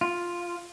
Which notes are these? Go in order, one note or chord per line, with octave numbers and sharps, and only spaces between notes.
F4